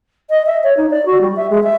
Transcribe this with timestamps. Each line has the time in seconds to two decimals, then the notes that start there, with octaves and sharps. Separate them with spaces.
0.30 D#5
0.46 E5
0.63 C#5
0.77 D#4
0.90 D5
1.05 F#4
1.21 G3
1.36 E5
1.50 G#3
1.63 E5